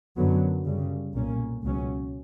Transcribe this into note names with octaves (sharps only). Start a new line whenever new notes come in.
F#2 D3 F#3 B3
F#2 C#3 G3
B1 A#2 A#3 C#4
C#2 B2 F#3 C#4